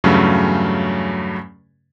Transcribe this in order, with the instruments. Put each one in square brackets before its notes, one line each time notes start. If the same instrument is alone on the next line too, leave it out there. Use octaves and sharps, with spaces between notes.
[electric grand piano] E2 G2 C#3 F#3 A3 C#4